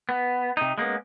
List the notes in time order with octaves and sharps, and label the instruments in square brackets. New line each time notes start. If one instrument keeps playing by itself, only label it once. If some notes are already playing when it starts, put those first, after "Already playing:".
[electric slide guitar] B3
C3 D#4
G#3 A#3 B3 C#4